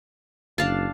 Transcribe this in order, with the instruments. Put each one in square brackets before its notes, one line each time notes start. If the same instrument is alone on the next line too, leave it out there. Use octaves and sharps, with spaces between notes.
[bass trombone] F#1 [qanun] D4 F5 A5